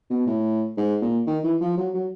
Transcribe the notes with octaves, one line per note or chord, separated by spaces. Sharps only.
B2
A2
G#2
A#2
D#3
E3
F3
F#3
F#3